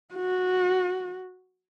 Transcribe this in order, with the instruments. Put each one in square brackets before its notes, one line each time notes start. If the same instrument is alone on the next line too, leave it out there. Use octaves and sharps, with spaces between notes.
[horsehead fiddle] F#4